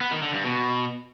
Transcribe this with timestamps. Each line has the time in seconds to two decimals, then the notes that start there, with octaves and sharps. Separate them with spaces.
0.01 B3
0.12 D#3
0.23 D3
0.34 G2
0.45 B2